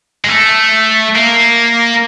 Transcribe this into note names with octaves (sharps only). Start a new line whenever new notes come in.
G#3
A3
A#3